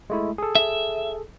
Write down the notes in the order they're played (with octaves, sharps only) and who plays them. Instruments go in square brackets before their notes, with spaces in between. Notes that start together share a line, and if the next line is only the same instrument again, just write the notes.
[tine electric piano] G#3 A3 E4
G#4 A4
[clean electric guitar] E5